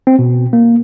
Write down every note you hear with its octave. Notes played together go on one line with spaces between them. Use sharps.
C4
B2
A#3